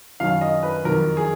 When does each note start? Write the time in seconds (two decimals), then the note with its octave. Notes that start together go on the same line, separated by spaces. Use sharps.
0.20 F#2 D#3 F#3 F5
0.41 D#5
0.63 B4
0.84 F2 D#3 F#3 A#4
1.17 G#4